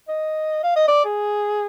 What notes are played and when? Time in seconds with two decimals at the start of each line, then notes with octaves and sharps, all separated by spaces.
0.08 D#5
0.63 F5
0.76 D#5
0.88 D5
1.05 G#4